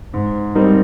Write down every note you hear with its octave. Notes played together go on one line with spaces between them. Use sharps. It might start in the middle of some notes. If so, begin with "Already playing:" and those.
G#2
G3 C4 D#4 A#4